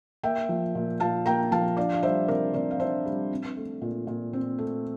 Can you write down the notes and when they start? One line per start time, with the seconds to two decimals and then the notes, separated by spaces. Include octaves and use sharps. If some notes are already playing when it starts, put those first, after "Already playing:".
0.23 A#3 E5 G5
0.49 F3
0.75 A#2
1.00 A#2 F5 A5
1.26 A#3 G5 A#5
1.52 F3 F5 A5
1.77 D4 D5 F5
1.93 F5
2.03 G3 C5 E5
2.28 C3 A#4 D5
2.54 C3 A#4 D5
2.71 F5
2.80 D4 C5 E5
3.06 G3
3.32 C4
3.56 A3
3.82 A#2
4.07 A#2
4.33 C4
4.58 A3